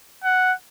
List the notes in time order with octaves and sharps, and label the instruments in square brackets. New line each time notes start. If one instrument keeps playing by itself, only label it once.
[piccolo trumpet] F#5